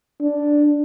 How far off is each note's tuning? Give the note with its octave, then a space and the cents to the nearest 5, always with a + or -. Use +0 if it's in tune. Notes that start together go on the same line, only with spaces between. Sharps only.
D4 +0